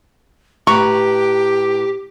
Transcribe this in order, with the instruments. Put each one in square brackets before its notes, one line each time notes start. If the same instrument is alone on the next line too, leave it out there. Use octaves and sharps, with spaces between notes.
[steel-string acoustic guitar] A2 B4 A#5 [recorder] G4 [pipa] C#6